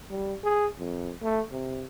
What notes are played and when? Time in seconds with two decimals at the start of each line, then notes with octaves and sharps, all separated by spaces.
0.10 G3
0.44 G#4
0.79 F2
1.23 A3
1.52 C3